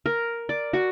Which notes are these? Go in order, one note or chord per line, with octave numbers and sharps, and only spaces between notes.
A#4
D5
F#4